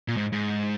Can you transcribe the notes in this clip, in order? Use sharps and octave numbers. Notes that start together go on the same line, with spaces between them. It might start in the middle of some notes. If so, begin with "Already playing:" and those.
A#2
G#2
G#2